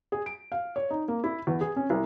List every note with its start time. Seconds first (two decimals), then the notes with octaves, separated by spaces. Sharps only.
0.12 G#4
0.26 D7
0.52 F5
0.76 C#5
0.90 D#4
1.08 A#3
1.24 E4
1.47 E2
1.61 G#4
1.76 C#4
1.90 C2